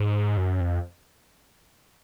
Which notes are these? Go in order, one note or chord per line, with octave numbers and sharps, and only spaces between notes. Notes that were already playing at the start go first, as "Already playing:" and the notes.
Already playing: G#2
F#2
F2